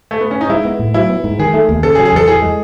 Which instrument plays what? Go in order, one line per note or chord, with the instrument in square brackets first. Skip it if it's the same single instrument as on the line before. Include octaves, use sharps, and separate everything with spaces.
[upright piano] A3
B3
C#4
D#4
[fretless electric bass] G#3 [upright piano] E4
[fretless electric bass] B3
A2
[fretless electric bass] F#3 [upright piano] E4
[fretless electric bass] B3
G#2
[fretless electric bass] D#3 [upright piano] G#4
[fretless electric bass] A3
D#2
[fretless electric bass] C#3 [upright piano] A4
[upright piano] G#4
[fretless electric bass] F#3
[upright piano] G#4
[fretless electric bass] E2 [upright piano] A4
[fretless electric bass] E3 [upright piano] G#4
[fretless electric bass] G#3